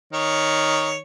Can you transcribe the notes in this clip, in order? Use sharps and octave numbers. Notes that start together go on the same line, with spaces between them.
D#3 C#5